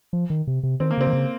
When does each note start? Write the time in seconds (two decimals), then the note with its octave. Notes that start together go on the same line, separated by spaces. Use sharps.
0.13 F3
0.30 D#3
0.47 C3
0.63 C3
0.80 D#3 C4
0.91 A#3
0.98 C#3 C4
1.07 D#3
1.13 C#3